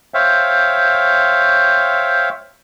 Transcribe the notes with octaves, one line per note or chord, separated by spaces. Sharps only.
C5 C#5 E5 F5 G5